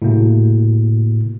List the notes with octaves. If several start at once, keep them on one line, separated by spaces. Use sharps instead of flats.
A2 C3 A#3 F#4